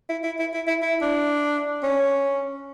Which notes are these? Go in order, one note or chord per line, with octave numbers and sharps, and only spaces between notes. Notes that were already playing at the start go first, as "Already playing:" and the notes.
E4
E4
E4
E4
E4
E4
D4
C#4